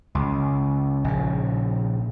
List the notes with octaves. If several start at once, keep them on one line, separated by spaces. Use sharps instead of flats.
C#2
A#1 C#3